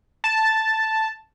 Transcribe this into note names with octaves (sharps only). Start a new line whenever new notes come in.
A5